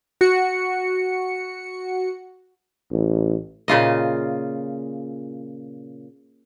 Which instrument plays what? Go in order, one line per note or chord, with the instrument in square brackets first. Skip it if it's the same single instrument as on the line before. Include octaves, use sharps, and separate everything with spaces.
[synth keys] F#4 C#7
[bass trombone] A1
[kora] A#2 C#3 F4 D#5